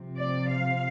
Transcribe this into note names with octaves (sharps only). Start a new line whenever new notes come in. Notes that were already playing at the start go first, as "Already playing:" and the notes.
Already playing: C3 F3 C4
D5
F5